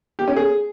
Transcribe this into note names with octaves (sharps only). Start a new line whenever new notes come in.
G4
C#4
G#4